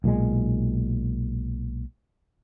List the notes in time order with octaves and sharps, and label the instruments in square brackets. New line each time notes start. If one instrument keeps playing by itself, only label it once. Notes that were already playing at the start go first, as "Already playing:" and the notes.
[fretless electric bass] B1 A#2 G3 G#3